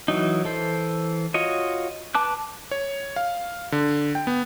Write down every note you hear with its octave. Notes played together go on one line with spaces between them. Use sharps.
E3 F#3 D#4
E3 A4 C5
F4 F#4 C#5 D#5
B4 A5 D6 F#6
C#5
F5
D3
G5
B3